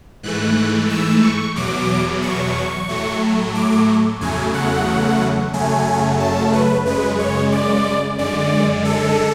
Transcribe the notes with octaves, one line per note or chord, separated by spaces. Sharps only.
G#2 E3 A3 F#6
E6
C#6
E2 B2 F#3 D6
C#6
A2 F#3 A3
D6
E2 C#3 F#3 A3 G#5
F#5
F#2 C#3 F#3 A3 G#5
A5
B4
F#2 C#3 G#3 B4
C#5
D5
F#2 D3 G#3 D5
A4